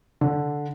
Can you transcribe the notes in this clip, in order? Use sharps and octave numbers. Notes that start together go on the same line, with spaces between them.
D3